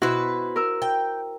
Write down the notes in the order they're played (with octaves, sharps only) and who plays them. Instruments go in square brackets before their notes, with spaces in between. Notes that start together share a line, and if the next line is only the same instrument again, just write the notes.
[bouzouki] B2 B4 [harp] E4 F#4 C5
[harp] A#4 E6
[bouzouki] G5